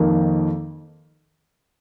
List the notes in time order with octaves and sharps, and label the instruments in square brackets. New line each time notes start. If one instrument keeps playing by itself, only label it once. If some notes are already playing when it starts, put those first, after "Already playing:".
Already playing: [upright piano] F2 D#3 A#3